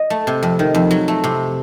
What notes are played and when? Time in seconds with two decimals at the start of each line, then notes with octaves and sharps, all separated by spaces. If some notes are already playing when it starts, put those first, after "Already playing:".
Already playing: D#5
0.10 A3
0.27 C3
0.43 F2
0.59 D#3
0.74 F2
0.91 F#3
1.08 A3
1.24 C3